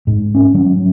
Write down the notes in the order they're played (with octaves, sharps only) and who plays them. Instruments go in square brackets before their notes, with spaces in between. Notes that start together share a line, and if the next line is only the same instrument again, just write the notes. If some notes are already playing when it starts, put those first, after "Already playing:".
[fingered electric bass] G#2
C#4
F#3